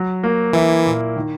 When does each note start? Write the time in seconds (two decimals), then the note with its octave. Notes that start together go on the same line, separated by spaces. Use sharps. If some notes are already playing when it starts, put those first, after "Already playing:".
Already playing: F#3
0.23 A#3
0.53 E3 E4
0.85 A#2
1.16 D#3